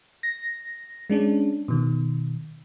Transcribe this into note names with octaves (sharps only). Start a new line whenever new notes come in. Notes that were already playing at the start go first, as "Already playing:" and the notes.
A#6
G#3 C#4 D4
B2 D#3